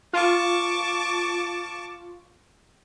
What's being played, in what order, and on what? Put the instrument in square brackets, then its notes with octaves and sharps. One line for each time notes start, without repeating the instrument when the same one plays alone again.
[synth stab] F4 [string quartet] A5 C#6 D6